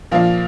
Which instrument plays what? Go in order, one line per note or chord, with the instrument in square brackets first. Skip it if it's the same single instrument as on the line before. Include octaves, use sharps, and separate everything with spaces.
[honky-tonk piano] A#2 F3 A#3 F4